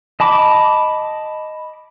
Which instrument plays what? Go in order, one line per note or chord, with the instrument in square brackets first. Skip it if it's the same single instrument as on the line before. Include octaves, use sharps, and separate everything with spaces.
[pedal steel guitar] D#5 A5 B5 D6